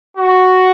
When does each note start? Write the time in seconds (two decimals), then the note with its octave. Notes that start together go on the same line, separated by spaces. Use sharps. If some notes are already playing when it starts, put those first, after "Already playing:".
0.17 F#4